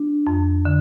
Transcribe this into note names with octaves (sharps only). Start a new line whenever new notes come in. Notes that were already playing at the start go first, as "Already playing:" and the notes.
Already playing: D4
F2
D3